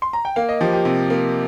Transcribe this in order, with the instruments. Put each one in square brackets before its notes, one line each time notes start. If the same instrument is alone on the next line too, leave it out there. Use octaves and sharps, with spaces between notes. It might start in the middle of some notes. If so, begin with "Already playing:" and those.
[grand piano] C6
A#5
G5
[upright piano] A#3 [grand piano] F5
[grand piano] D#5
[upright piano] F3 [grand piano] G4
[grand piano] G4
[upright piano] C3
A#3